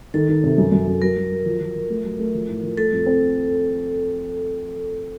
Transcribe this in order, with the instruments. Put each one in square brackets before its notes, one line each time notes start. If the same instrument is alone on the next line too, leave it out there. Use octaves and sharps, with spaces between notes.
[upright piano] D#3 [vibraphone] A4
[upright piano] D#3
C3
F#2
F#2
F#2
[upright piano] F#3 [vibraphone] A#4
[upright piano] F#3
F#3
F3
F3
F3
A3
F#3
A3
F3
A2
F3
[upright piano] A3 [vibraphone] A4
[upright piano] F2
C4